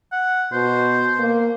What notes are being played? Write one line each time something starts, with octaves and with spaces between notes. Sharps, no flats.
F#5
B2 C5
A#3